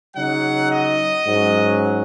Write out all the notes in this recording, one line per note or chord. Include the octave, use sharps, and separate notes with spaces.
C#3 F#3 D#4 F#5
D#5
G#2 F#3 C#4